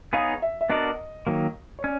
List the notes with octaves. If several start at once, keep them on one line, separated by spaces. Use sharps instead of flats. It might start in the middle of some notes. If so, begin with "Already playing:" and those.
B3 D#4 G#4 C#5 F5
E5
E5
B3 D4 F#4 A#4 D5 D#5
D#3 F#3 A#3
C#5
C#4 D5